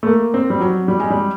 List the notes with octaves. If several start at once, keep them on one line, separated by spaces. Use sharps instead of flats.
A3
A#3
C4
G3
F#3
G3
G#3
G3